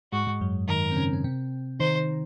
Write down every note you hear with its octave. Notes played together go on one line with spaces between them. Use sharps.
G#2 G#3 F#4
G#2 G#3
F#2 F#3
D#3 D#4 A#4
C4
C#3 C#4
C#4
C3 C4
D#3 D#4 C5